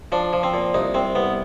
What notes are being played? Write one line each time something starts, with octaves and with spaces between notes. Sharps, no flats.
F3 D4
F3
C4
A#2
C2 D#4
C2 C4
C2 B3